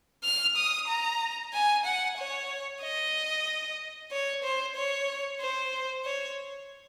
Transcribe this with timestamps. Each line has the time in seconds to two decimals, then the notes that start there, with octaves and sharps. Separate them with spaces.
0.23 F6
0.56 D#6
0.88 A#5
1.53 G#5
1.85 F#5
2.17 C#5
2.82 D#5
4.11 C#5
4.43 C5
4.76 C#5
5.41 C5
6.05 C#5